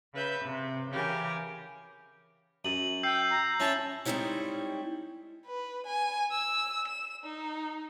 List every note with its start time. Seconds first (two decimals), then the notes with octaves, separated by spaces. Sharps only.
0.13 C#3 B4 E5 G6
0.44 C3
0.91 C#3 E3 G4 A#4 G#5
2.65 F#2 D#7 F#7
3.03 G5 E6 G6 C7
3.30 A#5
3.60 C#4 E4 C#5 A5
4.05 G3 G#3 C4 D#4 E4 C#5
5.46 B4
5.87 G#5
6.32 E6
6.88 E7
7.24 D#4